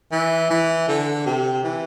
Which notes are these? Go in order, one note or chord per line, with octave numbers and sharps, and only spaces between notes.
E3
E3
D3
C3
E3